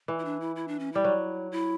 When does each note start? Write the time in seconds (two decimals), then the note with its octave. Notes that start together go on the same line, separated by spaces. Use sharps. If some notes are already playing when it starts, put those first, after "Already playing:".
0.08 E3
0.19 E4
0.25 D4
0.40 E4
0.56 E4
0.68 D4
0.79 C#4
0.93 G3 E4
1.04 F#3
1.51 E4